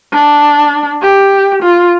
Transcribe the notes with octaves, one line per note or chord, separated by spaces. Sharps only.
D4
G4
F4